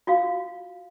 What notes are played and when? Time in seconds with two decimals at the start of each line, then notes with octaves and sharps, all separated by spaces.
0.07 F4 F#4 F5